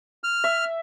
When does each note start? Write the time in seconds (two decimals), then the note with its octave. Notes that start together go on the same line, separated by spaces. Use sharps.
0.24 F6
0.44 E5